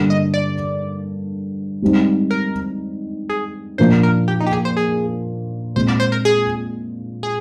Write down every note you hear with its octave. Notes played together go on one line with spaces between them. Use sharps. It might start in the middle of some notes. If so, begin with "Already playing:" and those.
Already playing: G2 D3 G3 A#3 D4
D#5
D5
G#2 G3 C4 D#4
A#4
G#4
A#2 F3 A#3 D4 C5
A#4
G4
D#4
G4
G#4
C5
G#4
A#2 G#3 C4 C5
D5
C5
A#4
G#4
G#4